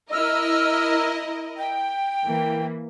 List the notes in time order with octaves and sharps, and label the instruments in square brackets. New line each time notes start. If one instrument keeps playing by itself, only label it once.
[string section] E4 A#4 D#5 [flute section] E6 F6
[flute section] G5
[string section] E3 A#3